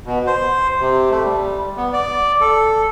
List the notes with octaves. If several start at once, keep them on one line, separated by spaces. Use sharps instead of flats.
B2
C5
C3
A3
G3
B3
D5
A4